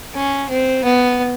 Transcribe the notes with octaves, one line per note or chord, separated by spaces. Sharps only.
C#4
C4
B3